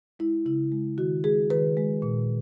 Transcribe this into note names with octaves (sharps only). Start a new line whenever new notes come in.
G#3 E4
C#3 E4
G#3
D#3 F#4
G#3 G#4
D#3 B4
G#3
A#2